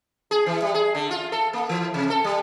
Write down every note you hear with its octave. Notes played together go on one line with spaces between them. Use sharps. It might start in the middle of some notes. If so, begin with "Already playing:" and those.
G#4
E3
G3
G#4
D3
F4
A4
A#3
E3
C3
A4
G3